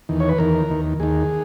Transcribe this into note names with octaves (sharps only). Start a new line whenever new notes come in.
E2 D#3
C#5
B4
E2 D#3 A#4
D#2 D#3
D#2 D#3 G#4